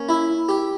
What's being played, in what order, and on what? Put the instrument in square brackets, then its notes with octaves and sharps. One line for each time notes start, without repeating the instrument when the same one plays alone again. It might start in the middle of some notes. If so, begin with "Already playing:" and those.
Already playing: [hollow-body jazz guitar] A#3 [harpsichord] C#4
[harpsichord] E4
G4